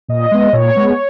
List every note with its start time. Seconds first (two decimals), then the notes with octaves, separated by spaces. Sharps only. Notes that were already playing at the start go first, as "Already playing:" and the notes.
0.08 A#2 D#5
0.31 G#3 B3
0.53 A#2 C#5
0.75 G#3 B3